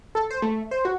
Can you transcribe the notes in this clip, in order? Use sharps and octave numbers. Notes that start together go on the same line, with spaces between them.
A4
C5
A3
C5
F#4